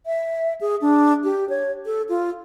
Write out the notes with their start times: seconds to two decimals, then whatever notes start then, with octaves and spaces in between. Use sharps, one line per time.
0.06 E5
0.61 G#4
0.81 D4
1.24 G4
1.49 C#5
1.86 A4
2.09 F4